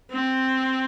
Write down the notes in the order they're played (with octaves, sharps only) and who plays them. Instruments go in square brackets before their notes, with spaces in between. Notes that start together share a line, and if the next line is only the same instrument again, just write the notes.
[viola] C4